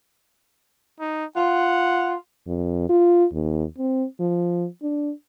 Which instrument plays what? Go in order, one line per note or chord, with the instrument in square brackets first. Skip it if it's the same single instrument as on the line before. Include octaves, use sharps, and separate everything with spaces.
[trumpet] D#4
[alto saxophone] F4 [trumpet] F#5
[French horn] F2
F4
D#2
C4
F3
D4